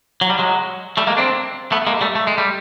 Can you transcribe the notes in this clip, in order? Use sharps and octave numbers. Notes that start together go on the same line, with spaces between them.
F#3
G3
F#3 G#3
G3 A3
G#3 A#3
C4 D4
A3 B3
G#3 A#3
G3 A3
A3
G#3
G3